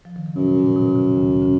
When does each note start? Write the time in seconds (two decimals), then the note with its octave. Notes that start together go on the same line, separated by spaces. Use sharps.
0.05 F3
0.16 D#3
0.26 C#3
0.35 F#2 B2
0.56 A#2
0.76 B2
0.96 C#3
1.15 D#2 D#3
1.42 C#3 C#4